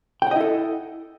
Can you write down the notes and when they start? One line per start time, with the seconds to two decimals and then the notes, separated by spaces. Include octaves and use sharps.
0.22 G5
0.27 F#5
0.31 D#5
0.36 E4
0.41 A4